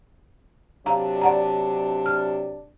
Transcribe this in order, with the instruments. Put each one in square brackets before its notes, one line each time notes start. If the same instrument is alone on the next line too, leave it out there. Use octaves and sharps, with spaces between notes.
[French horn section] C3 F#3 D4 [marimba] F5 A#5
[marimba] D5 F#5 A#5
F6